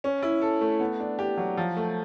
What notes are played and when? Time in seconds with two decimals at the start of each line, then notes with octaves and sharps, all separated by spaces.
0.04 C#4
0.22 E4
0.42 A4
0.61 A3
0.80 B3
1.00 D4
1.19 G4
1.37 F#3
1.57 F3
1.77 A3